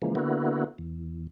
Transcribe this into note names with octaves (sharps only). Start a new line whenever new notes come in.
C#3 E3 F3 G#3 A#3
D3 A#3 B3 E4 F#4
E2